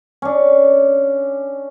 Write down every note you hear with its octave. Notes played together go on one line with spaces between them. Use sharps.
C#4 D4